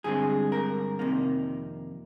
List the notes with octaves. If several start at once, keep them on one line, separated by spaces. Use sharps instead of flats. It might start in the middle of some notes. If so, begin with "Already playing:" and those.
G2 D3 G#3 C4 G#4
A#4
F2 C3 D#3 A#3